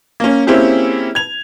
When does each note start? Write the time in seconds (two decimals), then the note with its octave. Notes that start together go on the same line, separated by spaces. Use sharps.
0.20 A#3 C#4
0.47 A#3 C4 C#4 E4 G4 G#4
1.15 G#6 F7